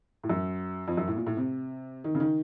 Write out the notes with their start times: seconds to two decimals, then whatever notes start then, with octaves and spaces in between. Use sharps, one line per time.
0.24 A2
0.29 F#2
0.88 F2
0.97 F#2
1.07 A2
1.16 A#2
1.27 A2
1.37 C3
2.04 D#3
2.15 C#3
2.20 D#3